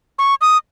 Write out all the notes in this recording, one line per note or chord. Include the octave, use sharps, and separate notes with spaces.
C#6
D#6